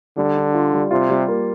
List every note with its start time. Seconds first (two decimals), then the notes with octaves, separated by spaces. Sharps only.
0.17 D3 G3
0.36 D4
0.54 F4
0.73 G3
0.91 C3 F4
1.10 G3
1.28 A#3